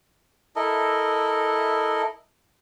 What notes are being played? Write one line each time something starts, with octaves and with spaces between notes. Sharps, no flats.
E4 A4 A#4 D#5